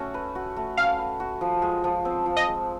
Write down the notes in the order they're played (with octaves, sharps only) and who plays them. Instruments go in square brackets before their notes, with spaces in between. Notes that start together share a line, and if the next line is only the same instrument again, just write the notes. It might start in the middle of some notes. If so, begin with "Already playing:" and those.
Already playing: [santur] A3 C#4 F#4
B4
F#4
A3
[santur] C#4 [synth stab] F5
[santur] B4
F#4
F3
G#3
F3
C4
F3
[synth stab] D#5
[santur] G#3